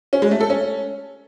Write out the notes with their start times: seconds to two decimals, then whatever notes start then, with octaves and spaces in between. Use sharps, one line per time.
0.13 C#4
0.22 G#3
0.31 A3
0.41 A4
0.50 C#4